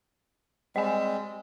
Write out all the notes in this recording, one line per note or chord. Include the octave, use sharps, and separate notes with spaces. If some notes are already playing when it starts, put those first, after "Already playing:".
G3 G#3 C4 D#5 G#5